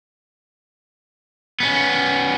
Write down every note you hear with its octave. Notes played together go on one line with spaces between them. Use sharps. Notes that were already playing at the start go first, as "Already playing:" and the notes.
B3 C#4